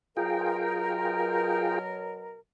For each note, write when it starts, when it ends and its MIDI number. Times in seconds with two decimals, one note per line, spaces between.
0.17 2.40 47
0.17 2.40 54
0.17 1.79 65
0.17 1.79 68
0.17 2.40 70
0.17 1.79 79